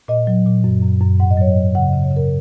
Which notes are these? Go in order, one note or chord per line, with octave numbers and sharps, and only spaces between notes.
A#2 D#5
F#3
A#2
F#2
F#2
F#2
G#2 F#5
D#5
F#3 C#5
G#2 D#5
C#3 F#5
C#3 D#5
C#5
C#3 A#4